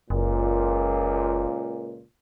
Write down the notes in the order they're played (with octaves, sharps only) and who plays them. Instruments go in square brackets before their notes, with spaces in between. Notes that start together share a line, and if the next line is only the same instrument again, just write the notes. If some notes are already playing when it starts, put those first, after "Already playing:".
[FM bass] F#1 [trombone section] C#2 A#2